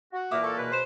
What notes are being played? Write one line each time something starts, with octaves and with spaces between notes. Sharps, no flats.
F#4
A#2 E3 A#3 E5 D6 D#6
A4 C#6
C#2 B2 B4
C5